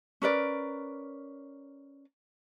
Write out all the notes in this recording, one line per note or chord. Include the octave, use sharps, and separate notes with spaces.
C#4 A#4 B4 D5